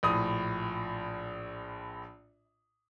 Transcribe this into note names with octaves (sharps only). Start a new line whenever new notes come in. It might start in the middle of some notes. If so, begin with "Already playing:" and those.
A#1 A2 D#6